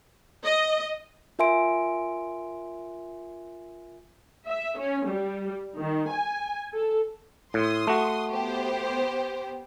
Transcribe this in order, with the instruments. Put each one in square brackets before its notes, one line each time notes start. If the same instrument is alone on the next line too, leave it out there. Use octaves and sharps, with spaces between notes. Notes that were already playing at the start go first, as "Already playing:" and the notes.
[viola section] D#5
[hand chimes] F4 A#4 E5 G#5 C6 D7
[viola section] E5
C#4
G3
D#3
G#5
A4
[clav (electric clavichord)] A2 [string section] C6 D#6
[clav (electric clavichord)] A3 F#4
[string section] B3 G4 C5